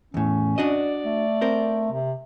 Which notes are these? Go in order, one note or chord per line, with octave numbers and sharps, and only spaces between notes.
E2 A2 C#4
D4 F#4 D5 D#5
A3
C4 A#4 C5
C3